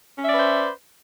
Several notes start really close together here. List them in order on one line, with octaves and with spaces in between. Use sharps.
C#4 E5 D5 B4 C5